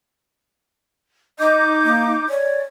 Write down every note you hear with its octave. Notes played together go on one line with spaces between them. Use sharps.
D#4 D#5 D6 G6
A#3
C#5 D5